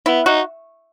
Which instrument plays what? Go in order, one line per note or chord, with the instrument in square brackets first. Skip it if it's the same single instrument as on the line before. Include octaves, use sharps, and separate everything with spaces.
[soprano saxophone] B3 [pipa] E4
[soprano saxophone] D#4 [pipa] F#4